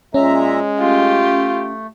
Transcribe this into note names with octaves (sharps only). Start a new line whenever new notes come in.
A#2 G#3 C#4 E5 A#5
A3 F4 G4